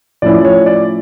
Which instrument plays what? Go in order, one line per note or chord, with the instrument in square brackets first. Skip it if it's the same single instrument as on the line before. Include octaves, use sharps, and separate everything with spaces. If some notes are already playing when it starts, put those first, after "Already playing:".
[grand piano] A2 F3 C#4 E4 D5
C#5
D5